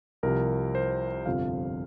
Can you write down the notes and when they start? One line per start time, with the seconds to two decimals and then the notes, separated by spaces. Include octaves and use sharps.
0.23 C2 C3 F3 A#4
0.75 C5
1.26 G1 F2 C3 F3 F5